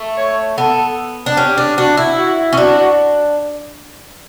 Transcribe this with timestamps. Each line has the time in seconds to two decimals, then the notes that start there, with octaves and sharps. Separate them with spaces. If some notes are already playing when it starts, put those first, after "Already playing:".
Already playing: A3
0.17 C#5
0.57 B3 A4
1.26 D4
1.37 C#4 G4
1.58 D4
1.77 D4 F#4
1.97 E4
2.17 F#4
2.53 C#4
2.57 D4 F#4